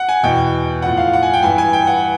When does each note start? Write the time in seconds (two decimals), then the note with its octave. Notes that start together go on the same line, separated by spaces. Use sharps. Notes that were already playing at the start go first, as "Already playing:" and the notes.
Already playing: F#5
0.09 G#5
0.23 E2 B2 G5
0.82 A2 F3 F#5
0.97 F5
1.13 F#5
1.23 G#5
1.33 G5
1.43 G2 E3 G#5
1.58 G#5
1.73 G5
1.87 F#5